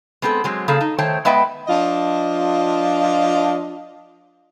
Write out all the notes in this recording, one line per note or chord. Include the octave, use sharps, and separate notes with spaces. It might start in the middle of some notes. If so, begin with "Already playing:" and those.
G#3 B3 C4 F#4 A4
F#3 G#3 C4
C#3 A#3 G#4 A4
D#4
D#3 A3 C5 C#5 G5 A5
G#3 B3 B4 D#5 E5 G5
F3 D4 F4 D#5